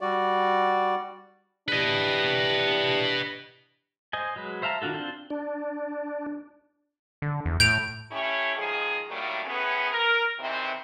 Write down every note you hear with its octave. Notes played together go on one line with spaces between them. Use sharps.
G3 F#4 D5
E3 D4 G4 B4 D#5
C5 D#5 G#5
F#3 G#3 B4
C5 E5 F5 A5 A#5
D#3 D4 F4 F#4 A4
C4 D4 F4 C5
D4
D3
E2
A2 G6 D7 F7
A3 C#4 E4 G4 C#5
D#3 F3 G#3 G#4
A2 D#3 F#3 G3 A3 A#3
A2 B3 C#4 G#4 B4
A#4
E2 C3 D#3 E3 C4